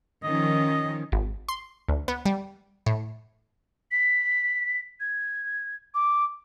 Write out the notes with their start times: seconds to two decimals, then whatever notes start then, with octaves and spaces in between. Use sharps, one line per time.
0.23 D#3 F3 C#4 D#5
1.12 G#1
1.49 C6
1.88 D2
2.08 B3
2.26 G3
2.86 A2
3.91 B6
5.00 G#6
5.94 D6